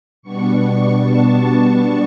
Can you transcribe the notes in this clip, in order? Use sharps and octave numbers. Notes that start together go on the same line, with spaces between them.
B2 G3 B3 D4 C#6
A5
A5